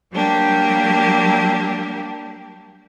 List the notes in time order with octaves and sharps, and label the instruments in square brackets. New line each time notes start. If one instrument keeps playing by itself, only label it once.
[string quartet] F#3 G3 A#3 D4 G4